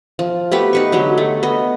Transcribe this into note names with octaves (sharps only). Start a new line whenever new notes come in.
F3
A3 B3 G4 B4
D#4 B4 C#6
D3 F#3 G#3 G4
A3
B3 D#5